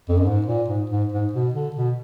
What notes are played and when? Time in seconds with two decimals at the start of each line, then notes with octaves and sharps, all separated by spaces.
0.09 F2
0.17 F#2
0.26 G#2
0.47 A#2
0.68 G#2
0.90 G#2
1.12 G#2
1.33 B2
1.54 D3
1.76 B2